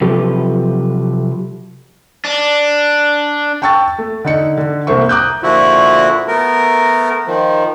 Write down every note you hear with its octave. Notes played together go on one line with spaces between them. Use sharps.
C3 F3 F#3 G4 A4 B4
D4
G5 A5 C#6 E6 A6
A3
D3 D#4 C#7
D3
C2 A#3 A4 C5 E5 C#6
A#5 D6 D#6 F#6 G6
A#2 D3 F3 E4 F#4
A3 B3 A#4
D#3 F3